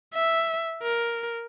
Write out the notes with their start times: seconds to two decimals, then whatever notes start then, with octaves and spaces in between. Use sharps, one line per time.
0.14 E5
0.82 A#4